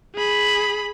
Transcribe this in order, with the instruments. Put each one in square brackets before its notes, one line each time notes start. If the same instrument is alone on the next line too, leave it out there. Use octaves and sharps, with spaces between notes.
[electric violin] G#4 B5